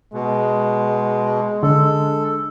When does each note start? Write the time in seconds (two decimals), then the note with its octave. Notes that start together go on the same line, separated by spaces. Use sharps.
0.14 B2 G#3
1.63 D3 A4